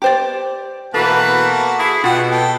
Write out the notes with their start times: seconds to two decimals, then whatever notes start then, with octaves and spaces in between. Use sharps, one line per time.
0.02 G4 C5 D5
0.94 B2 E3 A#3 F#4 A4 B4 A5
1.78 E4 G#4
2.04 B2 F4 F#5 G5
2.30 A4 G5